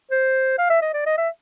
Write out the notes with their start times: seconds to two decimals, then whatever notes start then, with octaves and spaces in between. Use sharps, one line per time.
0.11 C5
0.58 F5
0.70 E5
0.82 D#5
0.93 D5
1.06 D#5
1.18 E5